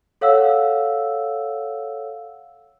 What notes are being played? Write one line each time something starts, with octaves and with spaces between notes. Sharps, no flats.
A4 C#5 F5 F#5 E6